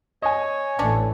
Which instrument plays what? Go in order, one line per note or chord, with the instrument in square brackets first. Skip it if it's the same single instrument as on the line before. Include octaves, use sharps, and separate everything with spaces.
[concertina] C#5 [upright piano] D#5 G#5
[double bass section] A1 E3 A3 [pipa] C#4 D4